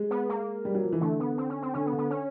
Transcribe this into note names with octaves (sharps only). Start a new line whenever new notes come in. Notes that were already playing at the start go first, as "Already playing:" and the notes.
Already playing: G#3
B3
A#3
G3
F#3
F3
E3
D3 A3
B3
C4
C#4
C4
D3 C#4
B3
D3
B3
C#4